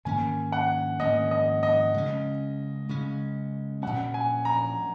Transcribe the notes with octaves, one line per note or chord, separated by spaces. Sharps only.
G#2 D#3 A#3 C#4 G#5
F#5
G#2 D#3 A#3 C#4 D#5
D#5
D#5
C#3 G#3 C#4
C#3 G#3 C#4
A#2 F#3 C#4 F#5
G#5
A#5